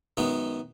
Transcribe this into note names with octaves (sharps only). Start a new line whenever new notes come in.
F#2 D#3 G#3 B3